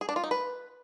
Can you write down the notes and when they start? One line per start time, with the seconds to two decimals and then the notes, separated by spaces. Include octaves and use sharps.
0.01 G#4
0.09 D4
0.16 F4
0.24 D#4
0.31 B4